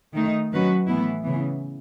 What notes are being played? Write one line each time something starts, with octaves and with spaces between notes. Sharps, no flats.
D#3 A3 D#4
D#3 F#3 C#4 F#4 B4
A2 E3 B3 E4
C#3 E3 B3